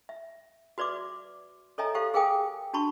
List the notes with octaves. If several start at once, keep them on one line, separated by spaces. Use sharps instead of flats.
E5
F#4 B4 D5 E5 D6
A4 C#5 D#5 E5 G#5 A#5
G4 A4 C5 F5
G#4 A#4 F5 G5 G#5 D#6
D4 F#4 A5 B5 C#6